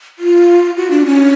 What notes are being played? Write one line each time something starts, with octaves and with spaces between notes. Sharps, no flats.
F4
F#4
D4
C#4